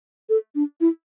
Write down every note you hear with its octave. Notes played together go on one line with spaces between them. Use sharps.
A4
D4
E4